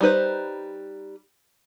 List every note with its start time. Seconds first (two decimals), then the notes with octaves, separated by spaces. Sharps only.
0.01 G3 D#4 B4 C5